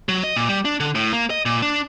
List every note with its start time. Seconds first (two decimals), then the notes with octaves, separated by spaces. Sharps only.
0.09 F#3
0.24 D#5
0.36 A#2
0.49 G3
0.65 D4
0.80 D3
0.95 A2
1.13 A#3
1.30 D#5
1.45 A#2
1.62 D4